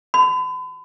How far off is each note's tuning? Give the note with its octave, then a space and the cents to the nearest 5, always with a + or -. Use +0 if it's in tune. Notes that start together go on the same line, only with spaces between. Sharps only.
B5 +40